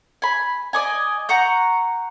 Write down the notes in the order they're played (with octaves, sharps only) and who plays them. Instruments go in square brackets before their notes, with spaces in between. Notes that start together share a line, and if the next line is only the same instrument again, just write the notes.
[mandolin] G#5 B5
D5 D#5 G#5
F#5 A#5 C#6 G6